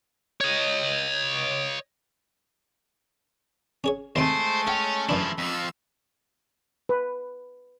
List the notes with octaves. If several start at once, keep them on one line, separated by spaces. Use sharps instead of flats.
C#5 D#5
C#4 G#4 C#5
D#2 C3 G#3 A3 C5
C#4 E5 F#5 G5
F#2 E3 F3 D4 E4
F2 F3 E6
B4